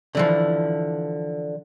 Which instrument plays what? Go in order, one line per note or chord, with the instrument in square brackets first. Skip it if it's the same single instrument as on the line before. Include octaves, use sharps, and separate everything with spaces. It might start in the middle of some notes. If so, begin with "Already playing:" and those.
[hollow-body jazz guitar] D3 E3 F3